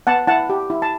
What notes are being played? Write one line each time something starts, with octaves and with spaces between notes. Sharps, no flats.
B3 F#5 A5
E4 F#5 A5
G4
E4
A5